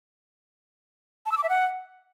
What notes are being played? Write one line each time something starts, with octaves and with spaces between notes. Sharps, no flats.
A5
E6
D6
E5
F#5